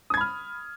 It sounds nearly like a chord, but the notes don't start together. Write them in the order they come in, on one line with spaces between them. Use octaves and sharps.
D#6 G#6 B5 F6